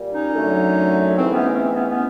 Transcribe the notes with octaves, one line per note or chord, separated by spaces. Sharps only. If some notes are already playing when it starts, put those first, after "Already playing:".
Already playing: A#2 G3
C#4 D#4
F#2 D3 F#3 A3
G#2 E3 A3 C4
B3 C#4
C#4
C4
B3 C#4
B3 C#4